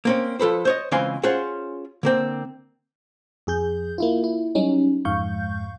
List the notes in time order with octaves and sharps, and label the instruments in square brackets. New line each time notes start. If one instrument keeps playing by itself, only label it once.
[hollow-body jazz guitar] A#3 C4 C#4
F3 A4 B4 C5
C5 C#5 D#5
C#2 E3 C4 F5 G#5 C6
C#4 F4 G#4 C5 F#5
D3 A#3 C4
[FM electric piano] F2 G#4 G6
A#3 E4 F4
E4
F#3 G3 C#4 D#4
F2 G#2 F5 C#6 G6